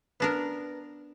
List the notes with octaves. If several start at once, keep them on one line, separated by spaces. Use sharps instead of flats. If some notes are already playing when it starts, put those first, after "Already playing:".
B3 D4 A#4 B4 A#6